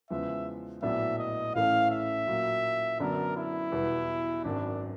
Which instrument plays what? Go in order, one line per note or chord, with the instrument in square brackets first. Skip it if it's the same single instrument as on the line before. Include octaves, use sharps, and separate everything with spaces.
[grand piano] E2 C#3 F3 G#3 [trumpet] E5
[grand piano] A#1 A2 F#3 B3 D4 [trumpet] E5
[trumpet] D#5
[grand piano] A1 A2 E3 A3 C#4 [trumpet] F5
[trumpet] E5
[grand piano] A#2 F#3 A#3
[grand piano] F#2 D3 F#3 B3 D4 [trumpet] A#4
[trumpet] E4
[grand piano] E2 B2 G3
[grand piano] G#1 F#2 D#3 F#3 [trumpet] D4